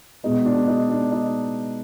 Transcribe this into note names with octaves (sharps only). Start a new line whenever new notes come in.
B2 G#3 B3 D#4
D4
D#4
D4
D#4